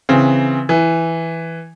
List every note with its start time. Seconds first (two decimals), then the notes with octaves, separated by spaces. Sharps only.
0.09 C#3 E3 C4
0.69 E3